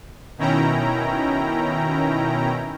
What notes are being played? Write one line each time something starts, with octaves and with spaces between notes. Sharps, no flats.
B2 D#3 C#4 E4 G5 A#5